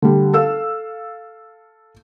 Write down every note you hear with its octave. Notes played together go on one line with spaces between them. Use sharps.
D3 G3
A4 F5 E6